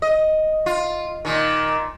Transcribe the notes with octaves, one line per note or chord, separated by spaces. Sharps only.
D#5
F4
A#2 D#3